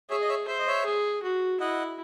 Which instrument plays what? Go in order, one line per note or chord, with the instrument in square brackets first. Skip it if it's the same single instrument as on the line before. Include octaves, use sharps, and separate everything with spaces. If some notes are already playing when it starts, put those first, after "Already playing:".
[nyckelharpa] G#4 [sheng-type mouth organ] C#5 E5
[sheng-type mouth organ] D#5
C#5 E5
[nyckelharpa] C5 [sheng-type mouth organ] E5
[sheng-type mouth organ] D#5
C#5 E5
[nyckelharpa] G#4
F#4
[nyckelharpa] E4 [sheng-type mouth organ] D#5 F#5